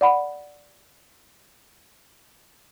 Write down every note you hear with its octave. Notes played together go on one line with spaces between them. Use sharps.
D5 F#5 B5